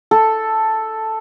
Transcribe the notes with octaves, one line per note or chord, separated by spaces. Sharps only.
A4